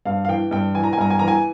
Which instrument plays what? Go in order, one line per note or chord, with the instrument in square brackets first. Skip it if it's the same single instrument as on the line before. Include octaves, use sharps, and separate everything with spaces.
[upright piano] G2 F5
F5
E3 G5
G2 G5
E3 G#5
A#5
G#5
G2 A#5
G#5
E3 A#5
G#5